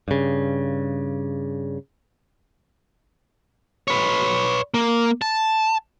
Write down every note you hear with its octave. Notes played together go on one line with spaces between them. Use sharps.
G2 C#3
B4 C#5
A#3
A5